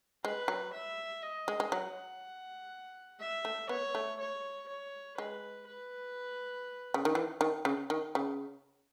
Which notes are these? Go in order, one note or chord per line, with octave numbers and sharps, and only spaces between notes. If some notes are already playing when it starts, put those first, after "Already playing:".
G#3 B4
F#3
E5
D#5
G#3
G#3
F#3 F#5
E5
A3
B3 C#5
A3
C#5
C#5
G#3 B4
B4
C#3
D#3
E3
D#3
C#3
D#3
C#3